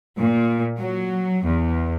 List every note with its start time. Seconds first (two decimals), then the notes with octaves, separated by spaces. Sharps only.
0.19 A#2
0.78 F#3
1.45 E2